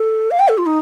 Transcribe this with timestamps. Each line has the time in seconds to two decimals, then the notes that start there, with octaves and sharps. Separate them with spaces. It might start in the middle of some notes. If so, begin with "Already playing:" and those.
Already playing: A4
0.31 F5
0.39 G5
0.49 A4
0.58 F4
0.66 D#4